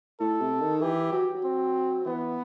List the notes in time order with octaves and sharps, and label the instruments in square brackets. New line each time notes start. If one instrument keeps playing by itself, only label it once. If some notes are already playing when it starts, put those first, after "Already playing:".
[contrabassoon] A2 [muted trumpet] A4
[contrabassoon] C3
D#3
[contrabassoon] E3 [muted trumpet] G4
[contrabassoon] F#3
F#3
[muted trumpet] C4
[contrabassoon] E3 [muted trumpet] B3